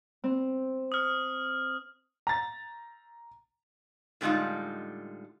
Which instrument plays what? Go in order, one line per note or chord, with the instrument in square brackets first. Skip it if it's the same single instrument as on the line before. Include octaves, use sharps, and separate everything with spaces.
[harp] C4
[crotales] D#6 F6
[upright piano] A#5 A6
[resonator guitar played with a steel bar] A2 D3 G3 G#3 D#4 F4